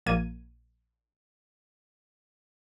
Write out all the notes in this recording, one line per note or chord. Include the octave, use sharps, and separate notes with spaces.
A#1 A#3 G#6 D#7